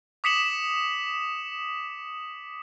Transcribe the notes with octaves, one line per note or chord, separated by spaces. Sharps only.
D6 D#6 B6 C#7 E7 F#7